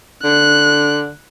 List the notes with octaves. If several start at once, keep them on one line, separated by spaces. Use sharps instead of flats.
D3 F#6